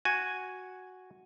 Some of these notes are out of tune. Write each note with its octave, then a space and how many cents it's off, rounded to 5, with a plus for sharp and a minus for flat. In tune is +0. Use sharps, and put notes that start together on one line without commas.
F#4 +0 G#5 +0